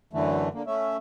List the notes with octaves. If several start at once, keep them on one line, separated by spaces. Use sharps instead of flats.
F#2 D3 E3 A3
D3 A#3
A3 C#4 E5